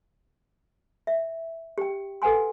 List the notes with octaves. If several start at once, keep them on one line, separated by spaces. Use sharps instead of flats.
E5
G4 G5
A4 B4 F#5 G#5 C6